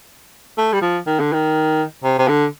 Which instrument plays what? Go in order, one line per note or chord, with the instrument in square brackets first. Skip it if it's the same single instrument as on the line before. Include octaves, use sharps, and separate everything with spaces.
[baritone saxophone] A3
G3
F3
D#3
D3
D#3
C3
C3
D3